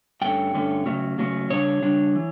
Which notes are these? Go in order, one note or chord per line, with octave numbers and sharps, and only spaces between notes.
G2 D3 A3 C#4 G5
G2 D3 A3 C#4
C#3 F#3 A3 C#4
C#3 F#3 A3 C#4
C#3 G3 D4 C#5
C#3 G3 D4
E3